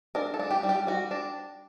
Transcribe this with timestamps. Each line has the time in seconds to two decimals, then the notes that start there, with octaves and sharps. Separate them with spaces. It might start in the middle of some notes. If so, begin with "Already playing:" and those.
0.15 D4 A#4
0.34 A4
0.39 D4
0.51 G4
0.63 G3
0.69 G4
0.87 G3 F#4
1.11 D4